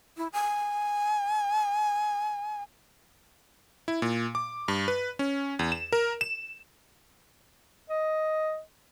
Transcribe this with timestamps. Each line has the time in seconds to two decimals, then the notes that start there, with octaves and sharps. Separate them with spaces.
0.17 E4
0.33 G#5
3.88 E4
4.02 A#2
4.35 D6
4.68 G2
4.88 B4
5.19 C#4
5.59 E2
5.72 E7
5.92 A#4
6.21 E7
7.90 D#5